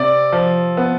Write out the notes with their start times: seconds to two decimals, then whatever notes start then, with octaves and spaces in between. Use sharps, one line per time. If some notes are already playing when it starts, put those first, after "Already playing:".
Already playing: C3 D5
0.33 F3
0.77 B3